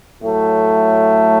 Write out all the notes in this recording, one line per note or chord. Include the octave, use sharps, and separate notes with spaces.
A2 F#3 A3